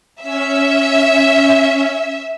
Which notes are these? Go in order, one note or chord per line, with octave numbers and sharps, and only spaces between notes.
C#4 E5